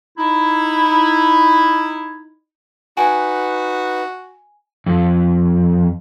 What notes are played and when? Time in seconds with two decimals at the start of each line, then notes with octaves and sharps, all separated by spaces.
0.18 D#4 E4
2.97 D#4 F#4 B4 G#5
4.86 F2